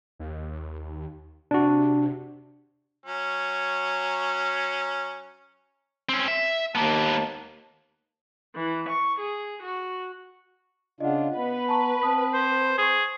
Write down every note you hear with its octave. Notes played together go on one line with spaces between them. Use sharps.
D#2
C3 D4 F#4
F#3 C#4
C4 C#4
E5
D#2 A#3 B3 A5
E3
C#6
G#4
F#4
C#3 D4 F4 D#5 F#5
B3 B4
A5 A#5 C#6
C4 A5 D#6 B6
C5
G#4 C5 C#6